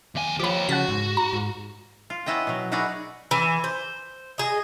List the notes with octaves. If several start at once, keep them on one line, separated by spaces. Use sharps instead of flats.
D#2 G#5
F3 G4 C#5 B5 D6
C#3 F#4 F#5 A5 B6
G#2
A#5
G#2
F4
B3 C#4 E4 D#5 G5
B2 F#3
D#4 E4 F#4 G#4 A#4 D5
E3
C5
G#4 D#5